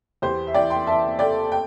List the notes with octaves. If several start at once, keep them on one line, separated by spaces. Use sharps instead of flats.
E2 G4 C5
E5
E3 D5 G5
G5 C6
E3 E5 A5
A3 D5 G5
G5